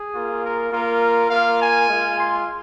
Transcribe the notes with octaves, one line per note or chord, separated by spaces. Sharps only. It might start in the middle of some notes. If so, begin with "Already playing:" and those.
Already playing: G#4
A#3 F4
A#4
A#3 F4 A#4
A#3 F4 F5
G#5
G#3 F4
C6